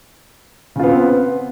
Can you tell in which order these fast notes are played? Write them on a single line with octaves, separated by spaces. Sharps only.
C#3 F4 B3 C4